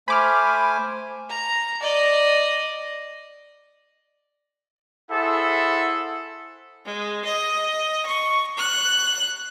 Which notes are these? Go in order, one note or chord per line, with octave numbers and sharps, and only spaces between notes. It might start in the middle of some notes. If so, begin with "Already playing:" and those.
A3 C5 G#5 B5 D6 F6
A#5
D5 D#5
E4 G#4 A4 C5 E5 F#5
G#3
D#5
C#6
F#6